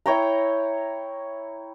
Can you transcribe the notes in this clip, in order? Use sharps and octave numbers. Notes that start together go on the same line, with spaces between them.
E4 C#5 G5 A#5